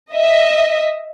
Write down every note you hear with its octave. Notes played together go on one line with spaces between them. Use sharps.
D#5 E5